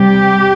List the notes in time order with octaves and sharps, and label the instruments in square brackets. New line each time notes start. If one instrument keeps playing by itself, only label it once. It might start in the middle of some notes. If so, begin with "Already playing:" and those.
Already playing: [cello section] C3 G3 G4